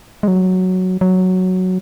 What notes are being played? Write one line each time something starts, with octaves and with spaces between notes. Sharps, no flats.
G#3
F#3
F#3